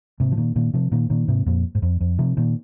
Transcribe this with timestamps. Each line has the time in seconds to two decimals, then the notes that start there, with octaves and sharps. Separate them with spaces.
0.20 G#2 C3
0.32 F3
0.37 A#2 D#3
0.56 A#2 D#3
0.74 C3 F3
0.92 A#2 D#3
1.10 A#2 D#3
1.28 G#2 C3
1.46 F2 A#2
1.75 G#2
1.82 F2
2.01 F2
2.19 C3 F3
2.37 A#2 D#3